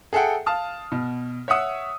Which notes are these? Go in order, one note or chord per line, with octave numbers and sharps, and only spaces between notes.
G#4 A4 E5 F#5 G5
F5 A5 D#6 F6
B2
C#5 E5 F#5 D#6 E6